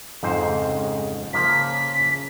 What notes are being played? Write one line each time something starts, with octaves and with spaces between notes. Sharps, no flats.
F2 G#2 C#3 G#3 C5
C#3 F3 A#3 B6